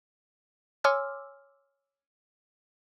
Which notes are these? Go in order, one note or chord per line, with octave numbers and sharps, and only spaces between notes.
C#5 G#5 C6 D6 E6 F6